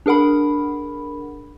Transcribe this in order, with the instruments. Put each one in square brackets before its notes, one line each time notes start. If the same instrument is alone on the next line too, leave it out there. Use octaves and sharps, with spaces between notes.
[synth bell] D4 G#4 A#4 F#5 B5